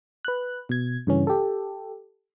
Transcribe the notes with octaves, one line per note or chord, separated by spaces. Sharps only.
B4 F#6
B2 G#6
G2 C#3 E3 C#4
G4 A4